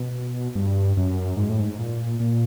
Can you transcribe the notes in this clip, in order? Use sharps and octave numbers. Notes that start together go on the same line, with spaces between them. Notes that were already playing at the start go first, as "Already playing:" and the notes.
Already playing: B2
G2
F#2
G#2
A2
G#2
A#2
A#2